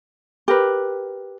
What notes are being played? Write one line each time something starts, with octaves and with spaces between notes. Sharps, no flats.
G4 A#4 B4